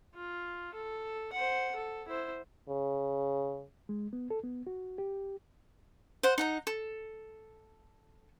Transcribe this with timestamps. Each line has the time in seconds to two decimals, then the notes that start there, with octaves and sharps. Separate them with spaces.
0.15 F4
0.75 A4
1.33 C5 F#5
1.76 A4
2.08 E4 C5
2.69 C#3
3.89 G#3
4.13 B3
4.30 A4
4.43 B3
4.67 F#4
4.98 G4
6.23 C5 F#5
6.38 D#4 F#5 A#5
6.67 A4